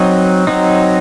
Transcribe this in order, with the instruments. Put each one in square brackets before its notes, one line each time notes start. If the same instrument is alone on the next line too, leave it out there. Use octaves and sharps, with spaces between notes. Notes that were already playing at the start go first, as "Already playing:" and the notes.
Already playing: [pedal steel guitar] F#3 C4 D#4
F#3 C4 D#4